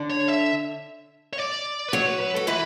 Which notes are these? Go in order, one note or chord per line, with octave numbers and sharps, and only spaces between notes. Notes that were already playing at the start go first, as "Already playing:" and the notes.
Already playing: D3 D4
C#5
E5
C#5
D5
B4
F#3 F#4 C#5
B4
B4
F#4 A4
E3 E4 B4